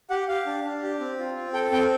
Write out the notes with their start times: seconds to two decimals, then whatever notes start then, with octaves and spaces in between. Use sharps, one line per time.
0.10 G4 F#5
0.28 G4 F5
0.46 D4
0.64 D4
0.82 G4
1.00 C4
1.19 F4
1.37 C4
1.54 A4 G5
1.72 C4 G5